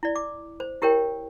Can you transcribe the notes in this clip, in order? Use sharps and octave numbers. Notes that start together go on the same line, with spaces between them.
E4 D5
D6
C5
E4 G4 A#4 C#5 G5